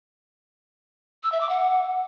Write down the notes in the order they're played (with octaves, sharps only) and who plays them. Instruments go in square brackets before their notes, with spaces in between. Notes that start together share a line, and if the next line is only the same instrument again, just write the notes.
[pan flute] E6
E5
D6
F#5